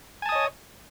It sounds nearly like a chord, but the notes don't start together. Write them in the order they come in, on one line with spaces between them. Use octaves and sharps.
G#5 A5 D#6 D#5 C#5